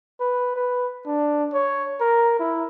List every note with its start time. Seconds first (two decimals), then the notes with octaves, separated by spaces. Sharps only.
0.20 B4
0.57 B4
1.06 D4
1.54 C#5
2.00 A#4
2.39 E4